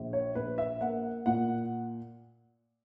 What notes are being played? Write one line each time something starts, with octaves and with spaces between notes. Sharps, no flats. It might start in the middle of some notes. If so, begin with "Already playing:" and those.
Already playing: A#1
C#5
A#1 B4
E5
A#3 F#5
A#2 F#5